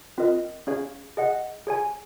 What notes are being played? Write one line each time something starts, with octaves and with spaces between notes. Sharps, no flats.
C4 F4 A#4 D#5
C#4 G#4 C#5 F5
G#4 D#5 F#5
G#4 C#5 G#5